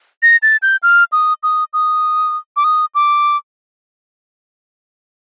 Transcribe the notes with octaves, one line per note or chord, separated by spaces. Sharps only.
A#6
A6
G6
F6
D#6
D#6
D#6
D6
D#6
D6